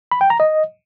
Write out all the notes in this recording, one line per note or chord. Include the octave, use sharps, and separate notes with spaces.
B5
G5
A#5
D#5